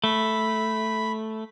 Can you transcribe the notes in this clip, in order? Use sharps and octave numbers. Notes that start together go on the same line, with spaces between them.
A3 B5